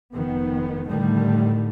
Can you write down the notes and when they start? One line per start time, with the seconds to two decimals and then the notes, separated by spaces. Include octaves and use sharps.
0.13 F1 D#3 B3
0.89 A2 D3 D#3 G3 A3